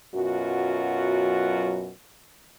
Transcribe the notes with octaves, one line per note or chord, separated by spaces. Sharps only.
F#2 B2 F#3 F4 F#4